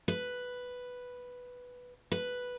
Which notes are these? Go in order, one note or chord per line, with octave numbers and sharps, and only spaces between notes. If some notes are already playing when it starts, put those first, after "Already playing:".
B4
B4